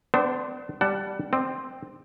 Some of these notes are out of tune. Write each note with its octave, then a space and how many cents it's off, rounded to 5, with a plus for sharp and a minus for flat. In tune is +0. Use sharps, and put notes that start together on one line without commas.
B3 +45 D4 +0 C5 +0
G3 +0 F#5 +25 A5 +0
C4 +0 D#5 -45